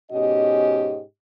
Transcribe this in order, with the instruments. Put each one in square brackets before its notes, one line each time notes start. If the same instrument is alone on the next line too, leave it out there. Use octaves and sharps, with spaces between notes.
[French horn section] G#2 B2 C#4 G4 D#5